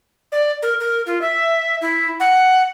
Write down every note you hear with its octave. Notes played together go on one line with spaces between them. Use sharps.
D5
A#4
A#4
F4
E5
E4
F#5